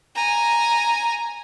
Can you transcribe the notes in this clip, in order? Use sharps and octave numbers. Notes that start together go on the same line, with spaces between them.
G#5 A#5